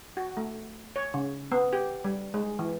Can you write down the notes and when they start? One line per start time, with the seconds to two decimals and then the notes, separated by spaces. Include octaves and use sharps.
0.17 F#4
0.37 A3
0.96 C#5
1.14 C#3
1.52 B3
1.73 G4
2.04 G3
2.34 G#3
2.59 E3